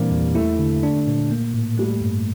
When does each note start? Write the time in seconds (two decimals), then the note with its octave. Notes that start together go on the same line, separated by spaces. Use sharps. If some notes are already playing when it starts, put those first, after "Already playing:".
Already playing: A#2 E3 G3 A#3 C4 D4
0.11 E2
0.35 A3 E4
0.59 D3
0.83 D4
1.07 A#2
1.31 A#3
1.54 A2
1.78 G3 A3
2.02 G2